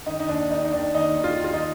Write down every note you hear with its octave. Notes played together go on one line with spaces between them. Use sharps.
D#3 D#4
D#4
D#2 D4
D#3 D#4
D#4
D#3 D4
D#2 D#4
D#3
F4
D#2
F4
D#4